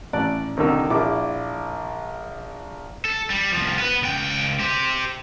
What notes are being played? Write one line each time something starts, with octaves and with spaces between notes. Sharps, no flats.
A1 D5 F#6
C2 D3 D#3 D#4 E6
A#1 E4 D6
A4
G3
C2 F3
B3 B4
C#2 G5
G4 C5